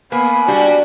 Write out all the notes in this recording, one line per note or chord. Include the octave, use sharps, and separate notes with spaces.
A#3 B3 B4 G#5
G3 D4 F#4 G4